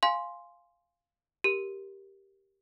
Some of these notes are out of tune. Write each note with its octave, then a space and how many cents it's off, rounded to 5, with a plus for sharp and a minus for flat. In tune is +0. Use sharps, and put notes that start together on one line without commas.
F5 +0 G#5 +0 C6 +0
G4 +0 A#4 +5